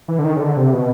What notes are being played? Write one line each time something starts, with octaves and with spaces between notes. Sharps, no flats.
E3
D3
D#3
C#3
D3
C3
B2